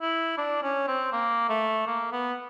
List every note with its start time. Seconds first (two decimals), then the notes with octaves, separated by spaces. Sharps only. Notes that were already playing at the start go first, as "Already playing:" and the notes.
0.01 E4
0.38 D4
0.63 C#4
0.88 C4
1.13 A#3
1.49 A3
1.87 A#3
2.12 B3